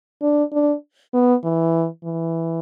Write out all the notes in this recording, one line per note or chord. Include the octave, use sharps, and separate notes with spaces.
D4
D4
B3
E3
E3